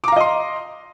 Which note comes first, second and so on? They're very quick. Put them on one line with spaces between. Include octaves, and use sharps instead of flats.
D6 A#5 F5 D#5 C6